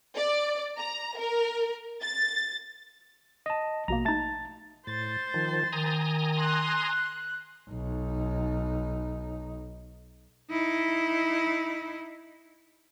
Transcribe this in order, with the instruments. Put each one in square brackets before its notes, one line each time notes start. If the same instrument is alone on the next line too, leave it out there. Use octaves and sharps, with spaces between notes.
[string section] D5
A#5
A#4
A6
[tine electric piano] D#5 A5
[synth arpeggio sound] A#1 B2 A#3 [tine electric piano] A#5
[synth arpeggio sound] A3 D#4 [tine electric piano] A5 A6
[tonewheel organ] A2 [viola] C5 [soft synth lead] A6
[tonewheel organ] D#3 F3
[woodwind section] D#3 [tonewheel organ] G#5 A#5 D#6
[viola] C6 [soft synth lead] F#6
[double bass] B1 D#4
[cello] D#4 E4